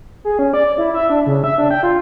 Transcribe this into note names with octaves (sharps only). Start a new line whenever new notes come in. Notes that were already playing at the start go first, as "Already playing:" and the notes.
G#4
C#4
D5
E4
E5
D4
C#3
E5
D4
G5
F4